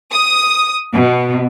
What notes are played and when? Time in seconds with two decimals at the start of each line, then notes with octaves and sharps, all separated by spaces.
0.13 D#6
0.93 B2